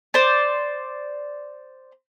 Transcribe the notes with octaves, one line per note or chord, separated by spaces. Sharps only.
C5 D5